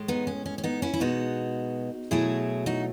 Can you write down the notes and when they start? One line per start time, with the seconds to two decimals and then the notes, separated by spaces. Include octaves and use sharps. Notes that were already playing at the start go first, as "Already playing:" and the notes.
Already playing: A2 G#3
0.08 B3 D#4
0.27 C#4
0.46 C#4
0.58 C#4
0.64 B3 D#4
0.82 C#4 E4
0.94 E4
1.00 B2 G#3 B3 D#4 F#4
2.11 B2 F#3 A3 E4 G#4
2.66 D#4 F#4